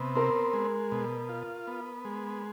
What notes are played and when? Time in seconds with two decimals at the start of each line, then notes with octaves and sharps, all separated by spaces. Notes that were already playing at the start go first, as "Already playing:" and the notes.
Already playing: C3 B3
0.15 C4 A#4
0.53 G#3
0.92 B2
1.29 F4
1.67 B3
2.05 G#3